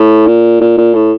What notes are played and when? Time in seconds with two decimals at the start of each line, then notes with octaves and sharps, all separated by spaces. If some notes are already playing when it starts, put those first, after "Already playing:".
Already playing: A2
0.27 A#2
0.61 A#2
0.78 A#2
0.95 A2